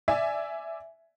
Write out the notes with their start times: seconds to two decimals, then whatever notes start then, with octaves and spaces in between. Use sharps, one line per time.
0.08 D5 E5 G#5